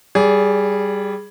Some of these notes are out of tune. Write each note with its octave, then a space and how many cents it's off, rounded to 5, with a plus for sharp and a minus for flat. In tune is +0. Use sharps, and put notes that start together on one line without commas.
G3 +0 G#4 +0 D5 -35